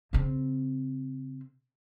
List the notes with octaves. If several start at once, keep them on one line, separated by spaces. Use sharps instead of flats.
C#3 C4